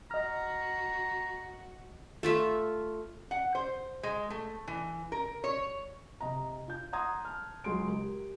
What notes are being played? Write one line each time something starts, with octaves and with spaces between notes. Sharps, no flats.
F#4 D#5 A#5 F6
A3 F4 E5
F#5
C5
G#3
A3
E3
A#4
C#5
C3 D#5 A#5
F4 G6
F#5 A#5 C6 D#6 G#6
A5 F6
C#2 F#3 G#3 C6 D7
G4 A#4